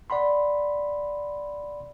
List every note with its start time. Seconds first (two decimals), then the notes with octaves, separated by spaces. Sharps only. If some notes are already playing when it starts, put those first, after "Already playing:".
0.10 D5 F#5 B5 C6